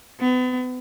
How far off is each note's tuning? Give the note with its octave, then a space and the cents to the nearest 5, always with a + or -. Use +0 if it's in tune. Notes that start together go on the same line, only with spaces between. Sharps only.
B3 +35